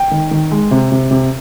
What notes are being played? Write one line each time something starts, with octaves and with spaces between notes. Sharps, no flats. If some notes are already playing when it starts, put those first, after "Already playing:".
Already playing: G5
D#3
D#3
G#3
C3
C3
C3